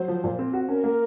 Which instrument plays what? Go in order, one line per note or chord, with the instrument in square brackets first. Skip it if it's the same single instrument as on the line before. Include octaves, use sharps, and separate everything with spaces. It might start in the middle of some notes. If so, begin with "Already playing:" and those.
Already playing: [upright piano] F#3 [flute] C5
[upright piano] F3
A#2
C4
F#4
[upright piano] C#4 [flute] A#4
[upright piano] A#3